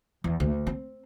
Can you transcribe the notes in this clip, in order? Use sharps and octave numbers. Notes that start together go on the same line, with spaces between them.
E2
D2
C4